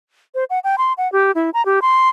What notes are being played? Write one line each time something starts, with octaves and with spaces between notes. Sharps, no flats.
C5
F#5
G5
C6
F#5
G4
E4
A#5
G4
C6